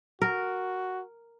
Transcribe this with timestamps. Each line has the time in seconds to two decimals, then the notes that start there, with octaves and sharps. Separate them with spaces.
0.22 F#4 A#4